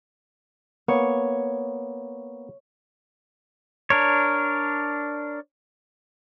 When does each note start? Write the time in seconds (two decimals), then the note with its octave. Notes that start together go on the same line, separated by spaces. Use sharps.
0.88 A#3 B3 C#5
3.90 D4 A#4 C#5